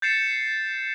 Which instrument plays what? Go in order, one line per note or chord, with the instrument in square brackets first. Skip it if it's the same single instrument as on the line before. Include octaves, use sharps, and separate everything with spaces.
[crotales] G6 A6 C7 C#7 E7